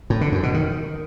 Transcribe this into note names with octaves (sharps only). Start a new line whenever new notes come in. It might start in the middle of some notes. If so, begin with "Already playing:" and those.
A2
D3
F#2
B2
D#3